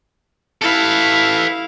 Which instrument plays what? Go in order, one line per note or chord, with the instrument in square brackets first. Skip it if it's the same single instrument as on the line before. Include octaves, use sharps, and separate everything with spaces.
[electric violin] E4 F5 [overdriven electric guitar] A4 B4